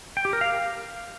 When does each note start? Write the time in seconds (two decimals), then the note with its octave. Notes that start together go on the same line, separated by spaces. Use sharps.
0.17 G5
0.25 G4
0.33 A#4
0.41 F5